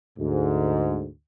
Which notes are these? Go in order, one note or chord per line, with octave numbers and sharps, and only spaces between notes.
D2 G#2